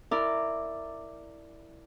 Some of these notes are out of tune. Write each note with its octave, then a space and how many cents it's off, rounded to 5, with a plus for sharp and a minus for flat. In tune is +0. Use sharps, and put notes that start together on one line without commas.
E4 +0 A#4 -20 D5 +0